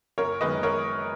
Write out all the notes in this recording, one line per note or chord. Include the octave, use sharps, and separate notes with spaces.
F#1 A#4 C#5
F#2 D#3 G#3 B3 B4 D#5
A#4 C#5